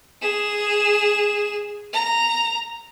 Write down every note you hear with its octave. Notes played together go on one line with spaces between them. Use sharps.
G#4 E7
A#5